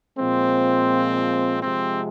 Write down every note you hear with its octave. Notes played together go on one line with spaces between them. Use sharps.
A#2 F3 G#3 C4
C3 F3 G#3 C4